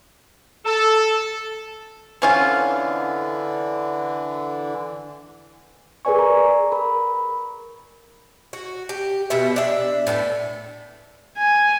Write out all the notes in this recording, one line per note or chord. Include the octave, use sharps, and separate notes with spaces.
A4
D3 E3 C4 C#4 F4
G#4 A#4 B4 D5 G#5 C#6
A#5
A#4 B5
F#4
G4
B2 G3 B3 E5
D4 E5
A2 B3 G4 A4
G#5